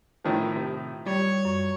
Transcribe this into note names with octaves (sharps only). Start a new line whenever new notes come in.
A2 D#3 F3
C3
G3 C#5
F#2 C#6